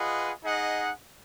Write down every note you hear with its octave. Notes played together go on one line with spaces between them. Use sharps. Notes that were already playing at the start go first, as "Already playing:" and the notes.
Already playing: F4 G#4 B4 D#5 F#5
D#4 G#4 D#5 F#5